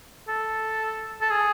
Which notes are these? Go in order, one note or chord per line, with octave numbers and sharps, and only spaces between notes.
A4
A4
G#4